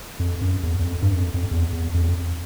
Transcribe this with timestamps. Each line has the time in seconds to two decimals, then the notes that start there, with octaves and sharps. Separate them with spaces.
0.19 F2
0.41 F#2
0.63 E2
0.79 E2
0.85 F2
1.02 G2
1.13 F#2
1.18 F2
1.34 F2
1.51 E2
1.73 E2
1.94 F2
2.01 E2
2.08 F2